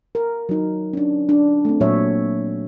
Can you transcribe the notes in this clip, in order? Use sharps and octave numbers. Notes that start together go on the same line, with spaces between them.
A#4
F#3 D#4
C#4 D4
D4
A3 C4
A#2 F#3 C#5 E5